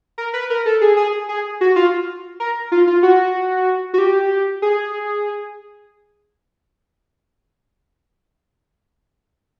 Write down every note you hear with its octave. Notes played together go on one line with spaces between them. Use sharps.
A#4
B4
A#4
A4
G#4
G#4
G#4
F#4
F4
A#4
F4
F4
F#4
F#4
G4
G#4